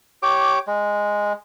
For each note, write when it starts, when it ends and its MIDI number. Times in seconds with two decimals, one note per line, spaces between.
0.23 0.59 67
0.23 0.59 73
0.23 0.59 86
0.67 1.33 56